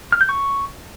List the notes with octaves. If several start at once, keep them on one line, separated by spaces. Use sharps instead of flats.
F6
G6
C#6